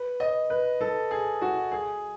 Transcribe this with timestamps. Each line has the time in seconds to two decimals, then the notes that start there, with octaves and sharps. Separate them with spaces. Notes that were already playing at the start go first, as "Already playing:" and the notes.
Already playing: B4
0.20 D#5
0.50 B4
0.81 A4
1.11 G#4
1.41 F#4
1.72 G#4